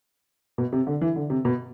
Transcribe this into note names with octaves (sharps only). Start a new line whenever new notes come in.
B2
C3
D3
E3
D3
C3
B2